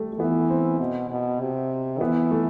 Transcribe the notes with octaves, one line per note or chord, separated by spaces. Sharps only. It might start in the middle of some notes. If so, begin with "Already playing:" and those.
Already playing: G3 A3
A3
E3 B3
C4
B2
B2
C3
E3 B3
A3